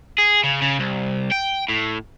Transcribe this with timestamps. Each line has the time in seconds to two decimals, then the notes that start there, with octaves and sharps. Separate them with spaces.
0.18 G#4
0.44 C#3
0.62 C#3
0.80 C2
1.32 G5
1.69 A2